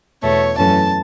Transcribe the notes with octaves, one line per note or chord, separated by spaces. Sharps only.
E2 B2 A3 C#5
F#2 E3 A3 C#4 A5